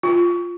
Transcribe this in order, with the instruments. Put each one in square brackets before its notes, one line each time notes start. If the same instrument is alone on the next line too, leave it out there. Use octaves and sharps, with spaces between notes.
[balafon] F4